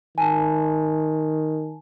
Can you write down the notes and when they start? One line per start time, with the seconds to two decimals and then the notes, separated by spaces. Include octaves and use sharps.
0.18 D#3 G#5 A5